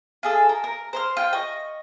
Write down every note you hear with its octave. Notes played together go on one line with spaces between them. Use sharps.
F4 G#4 A4
A#4
A#4
C5 C6 F6
F4 G5
D#5 C#6